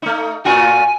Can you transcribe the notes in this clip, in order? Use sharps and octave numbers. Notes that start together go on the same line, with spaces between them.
A3 D#4
A2 F4 F#4 G#5